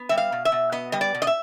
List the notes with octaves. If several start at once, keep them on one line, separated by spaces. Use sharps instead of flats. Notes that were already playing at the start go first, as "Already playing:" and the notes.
Already playing: B3
G3 E5
F5
B2
E5
B2
B3 D#5
G3 D#5
D5
B2
D#5
E5